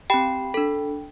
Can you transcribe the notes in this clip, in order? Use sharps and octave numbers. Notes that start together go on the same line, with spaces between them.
C4 G4 G5 B5
D4 A4